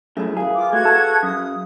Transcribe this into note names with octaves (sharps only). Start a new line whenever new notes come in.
F#2 A3 E4 G#4
G#4 B4 F5
F4 D6
A3 F#4 G#6
A4
F#2 D#6